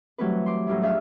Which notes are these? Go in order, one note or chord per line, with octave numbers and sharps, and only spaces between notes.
E3 F#3 G3 A3 C4 B4
C6 D6
A2 F#3 G3 C#4 E4
F2 D4 G#4 E5 F5 E6